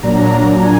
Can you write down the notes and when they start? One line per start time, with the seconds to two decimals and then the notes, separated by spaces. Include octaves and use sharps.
0.03 A#2 F#3 D4 A#5
0.62 G#5